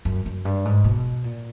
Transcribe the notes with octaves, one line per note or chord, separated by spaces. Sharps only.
F#2
F#2
G2
G#2
B2
A#2